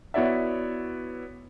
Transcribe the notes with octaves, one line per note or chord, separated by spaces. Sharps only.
B3 E4 F#4 C#5 D5 E5